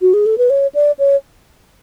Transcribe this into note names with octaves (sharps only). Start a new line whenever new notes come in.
F#4
G#4
A4
B4
C#5
D5
C#5